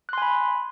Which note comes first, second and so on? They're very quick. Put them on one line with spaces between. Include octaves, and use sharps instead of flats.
F#6 C6 G#5 B5